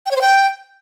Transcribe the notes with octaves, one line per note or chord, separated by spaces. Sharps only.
G5
C#5
C5
G5